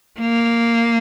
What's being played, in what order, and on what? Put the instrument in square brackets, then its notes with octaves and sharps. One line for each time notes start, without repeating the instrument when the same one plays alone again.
[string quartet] A#3